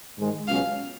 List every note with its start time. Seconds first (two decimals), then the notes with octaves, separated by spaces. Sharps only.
0.18 G#2 D#3 G#3
0.47 C#2 B2 F#3 C#4 F5